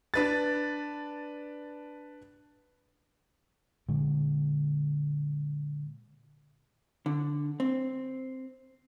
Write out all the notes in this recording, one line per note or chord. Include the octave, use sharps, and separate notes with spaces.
D4 B4 A6
A#2 D3 G#3
D3
C4